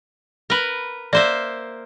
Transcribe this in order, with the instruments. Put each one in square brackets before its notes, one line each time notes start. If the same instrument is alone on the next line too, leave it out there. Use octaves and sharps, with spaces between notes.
[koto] A#4 B4
[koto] A#3 C5 E5 [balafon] D5